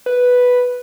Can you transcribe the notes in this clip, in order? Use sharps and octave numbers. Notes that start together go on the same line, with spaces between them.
B4